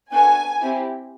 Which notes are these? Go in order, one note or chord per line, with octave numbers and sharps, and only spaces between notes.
B3 D4 F#4 A4 G#5
C4 E4 G4